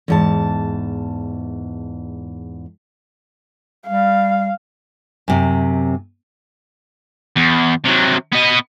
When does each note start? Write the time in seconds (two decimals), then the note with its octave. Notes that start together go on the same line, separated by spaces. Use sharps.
0.08 E2 G#2 A5
3.87 G3 F5
5.28 F#2 C3
7.37 E2
7.85 C3 F#3
8.32 B3 D#5